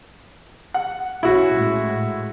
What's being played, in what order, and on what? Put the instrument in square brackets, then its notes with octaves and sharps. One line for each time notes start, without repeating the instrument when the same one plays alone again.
[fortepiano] F#5
[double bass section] B1 C#4 [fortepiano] E4 F#4
[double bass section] A2 G#3